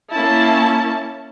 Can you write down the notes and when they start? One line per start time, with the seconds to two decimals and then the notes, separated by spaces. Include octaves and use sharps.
0.12 A#3 C#4 E4 A5